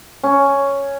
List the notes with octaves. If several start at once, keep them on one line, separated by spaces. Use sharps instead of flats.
C#4